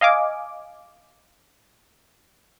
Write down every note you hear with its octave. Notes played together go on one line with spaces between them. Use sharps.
D#5 F5 G#5 D6